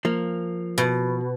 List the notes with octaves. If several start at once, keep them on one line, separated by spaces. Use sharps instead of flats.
F3 A#3
B2